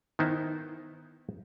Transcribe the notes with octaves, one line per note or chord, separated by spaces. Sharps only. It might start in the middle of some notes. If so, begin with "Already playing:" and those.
D#3 B3 D#4 E4 C5